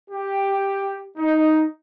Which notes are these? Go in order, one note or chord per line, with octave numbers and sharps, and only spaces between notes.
G4
D#4